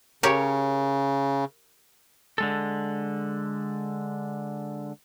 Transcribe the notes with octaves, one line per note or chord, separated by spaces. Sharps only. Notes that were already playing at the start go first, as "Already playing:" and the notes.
C#3 G4 A#4 C#5
D3 G#3 A4